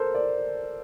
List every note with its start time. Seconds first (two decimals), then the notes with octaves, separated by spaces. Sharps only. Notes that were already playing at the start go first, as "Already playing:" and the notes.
Already playing: A4 A#4 C5
0.14 A#4 D5